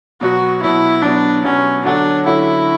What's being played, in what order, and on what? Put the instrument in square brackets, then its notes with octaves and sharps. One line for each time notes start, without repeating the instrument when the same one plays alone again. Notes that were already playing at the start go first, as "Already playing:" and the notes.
[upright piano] B2 F#3 B3 [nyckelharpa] F#4
[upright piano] B2 F#3 B3 [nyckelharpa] E4
[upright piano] B2 F#3 B3 [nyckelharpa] D4
[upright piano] B2 F#3 B3 [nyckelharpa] C#4
[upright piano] D3 F#3 C#4 F#4 A4 [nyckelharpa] D4
[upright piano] D3 F#3 C#4 F#4 A4 [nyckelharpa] E4